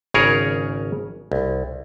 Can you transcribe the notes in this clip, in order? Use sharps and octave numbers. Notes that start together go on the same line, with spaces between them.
G#1 C#3 G#4 A#4 C#5
C2